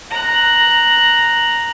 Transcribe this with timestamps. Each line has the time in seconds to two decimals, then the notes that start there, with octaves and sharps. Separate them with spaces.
0.10 A#5 F#6